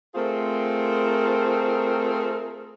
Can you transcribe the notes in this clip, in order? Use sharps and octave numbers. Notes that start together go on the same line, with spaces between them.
A3 C4 F4 G#4 A#4 C5